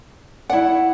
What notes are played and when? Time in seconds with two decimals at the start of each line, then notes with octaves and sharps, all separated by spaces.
0.50 E4 D5 F#5